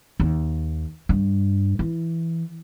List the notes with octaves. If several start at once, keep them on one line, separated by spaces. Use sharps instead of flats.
D#2
G2
E3